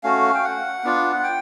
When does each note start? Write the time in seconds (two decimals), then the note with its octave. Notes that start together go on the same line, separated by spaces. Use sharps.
0.03 A3 C#4 F#4 F5
0.34 G5
0.44 F#5
0.84 B3 D4 F4
1.23 G5